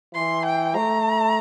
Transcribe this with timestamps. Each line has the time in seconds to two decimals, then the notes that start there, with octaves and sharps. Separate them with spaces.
0.14 E3 C6
0.45 G5
0.76 A3 A#5